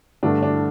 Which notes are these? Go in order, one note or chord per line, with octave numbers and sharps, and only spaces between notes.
G2 D3 A3 D4
D4